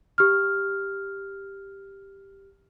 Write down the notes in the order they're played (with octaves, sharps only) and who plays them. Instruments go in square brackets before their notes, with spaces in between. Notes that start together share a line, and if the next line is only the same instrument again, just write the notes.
[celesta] G4 F6